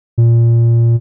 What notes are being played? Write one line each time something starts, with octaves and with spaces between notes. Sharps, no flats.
A#2